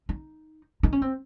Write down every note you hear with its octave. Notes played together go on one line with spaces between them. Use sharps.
D#4
D#4
C#4
C4